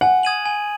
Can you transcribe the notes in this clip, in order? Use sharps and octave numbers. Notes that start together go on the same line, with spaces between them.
F#5 G#5
D#6 G#6 D#7 F#7
G#5